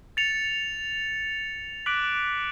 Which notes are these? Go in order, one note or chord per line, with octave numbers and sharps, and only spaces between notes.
A6 C#7 F7
D6 F#6 B6 D7 F#7